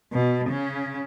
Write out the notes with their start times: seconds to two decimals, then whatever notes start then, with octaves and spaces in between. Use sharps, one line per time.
0.12 B2
0.49 C#3 C#4